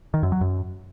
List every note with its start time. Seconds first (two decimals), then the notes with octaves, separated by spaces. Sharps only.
0.14 D#3
0.23 F#2
0.32 F#3
0.41 F#2